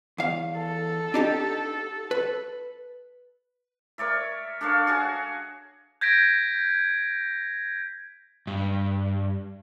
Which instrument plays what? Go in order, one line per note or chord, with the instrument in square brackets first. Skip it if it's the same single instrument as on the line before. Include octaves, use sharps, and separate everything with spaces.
[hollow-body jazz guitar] E2 F5
[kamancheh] A4
[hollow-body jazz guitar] D4 D#4 G4
B4
[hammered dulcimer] A#4 C#5 D5 E5
D4 A4 C#5 F5
F#4 G#4 C#5
[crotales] G6 G#6 A#6 B6 D7
[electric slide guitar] G2